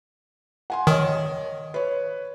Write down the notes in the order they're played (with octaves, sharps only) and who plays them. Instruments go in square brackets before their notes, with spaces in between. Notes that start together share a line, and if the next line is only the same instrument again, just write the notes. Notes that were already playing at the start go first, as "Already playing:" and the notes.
[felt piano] F#5 G#5 C6
[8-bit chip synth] D#3 [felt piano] C#5 D#5 D#6
[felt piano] B4 C#5